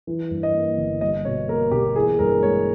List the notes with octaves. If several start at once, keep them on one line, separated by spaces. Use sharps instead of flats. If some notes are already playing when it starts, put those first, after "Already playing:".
E3
G2
D#5
A#3
G1
G3 D#5
B2 C#5
A#3 A#4
B1 G4
E3 G#4
G2 A#4
G#3 C#5